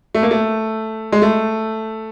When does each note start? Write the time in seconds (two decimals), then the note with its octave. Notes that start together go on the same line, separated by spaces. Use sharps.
0.15 A3
0.23 A#3
0.31 A3
1.12 G#3
1.22 A3